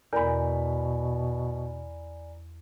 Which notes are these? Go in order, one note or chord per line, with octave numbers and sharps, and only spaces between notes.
E2 B2 A#4 D5 G#5 B5